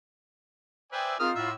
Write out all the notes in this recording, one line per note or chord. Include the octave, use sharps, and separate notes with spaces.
B4 C5 D5 E5 G5 G#5 D#6 E6
D#3 C4 D#4 F4 G#4 A#4 D#6 F6
A2 F#4 E5